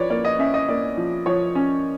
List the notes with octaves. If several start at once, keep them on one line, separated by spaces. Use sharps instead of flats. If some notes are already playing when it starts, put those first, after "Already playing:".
Already playing: F3 B4 C#5 D5
A#3 D5
D#5
C#4 E5
D#5
A#3 D5
F3
F3 C#5
C#4